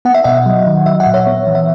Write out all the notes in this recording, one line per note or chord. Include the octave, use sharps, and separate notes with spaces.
B3 F#5
E5
B2 D#5 F#5
F#3
D#3
F#3 E5
F#5
A#2
C#5 E5
B3
E3
E5